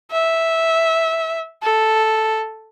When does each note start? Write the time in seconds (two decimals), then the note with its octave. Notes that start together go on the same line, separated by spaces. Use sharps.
0.12 E5
1.63 A4